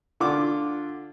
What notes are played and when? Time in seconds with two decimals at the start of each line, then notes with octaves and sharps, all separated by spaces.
0.20 D3 F4 D6